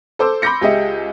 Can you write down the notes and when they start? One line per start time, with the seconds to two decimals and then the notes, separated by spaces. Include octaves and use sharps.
0.19 A4 C5 D6 E6
0.42 B5 C6 D6 G6 A#6 C#7
0.61 C#2 G4 G#4 D#5 E5